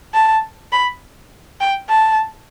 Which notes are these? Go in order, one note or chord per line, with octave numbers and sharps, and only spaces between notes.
A5
B5
G5
A5